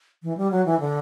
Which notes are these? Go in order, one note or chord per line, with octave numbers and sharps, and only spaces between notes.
E3
G3
F#3
E3
D3